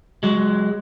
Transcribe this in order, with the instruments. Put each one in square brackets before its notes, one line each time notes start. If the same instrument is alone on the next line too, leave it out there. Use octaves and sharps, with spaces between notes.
[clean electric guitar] F#3 G#3